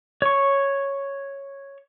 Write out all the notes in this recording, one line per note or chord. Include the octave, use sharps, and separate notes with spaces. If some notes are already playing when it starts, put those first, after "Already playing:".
C#5 C#6